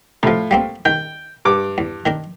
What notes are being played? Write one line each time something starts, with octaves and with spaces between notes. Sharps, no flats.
A2 C3 F3 F4
G3 A#3 C4
D#3 G5
G2 D6
E2
D#3 D4 A#4